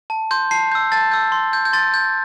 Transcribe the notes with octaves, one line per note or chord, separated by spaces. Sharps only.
A5
C6 G6
A5 C7
E6 G6
A5 A6
E6 G6
C6
G6
G6
C6 A6
G6